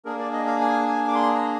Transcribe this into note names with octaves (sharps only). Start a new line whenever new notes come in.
A#3 D4 G#4 A#4
D5
D#5
F5
G#5
G#5
D6
C6
A#5